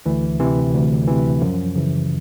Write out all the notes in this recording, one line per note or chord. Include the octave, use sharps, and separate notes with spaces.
D2 E3
C3 E3
D2
C3 E3
F#2 F3
C#3 E3